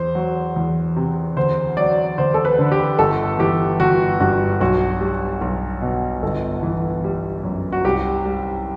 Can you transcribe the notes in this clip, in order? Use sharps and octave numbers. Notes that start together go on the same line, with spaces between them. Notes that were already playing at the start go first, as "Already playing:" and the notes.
Already playing: E2 C5
F#3
E2
C3
D2 C5
F#3 D5
D2 C5
A4
B4
D3
G4
G1 A4
E3 G4
G1 F#4
G2 F#4
B1 F#4
G3
B1
B2
G1 A4
E3
G3
F#2
F#4
C2 G4
G3